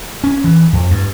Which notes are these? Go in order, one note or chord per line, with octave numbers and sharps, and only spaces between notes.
C#4
E3
F2
G2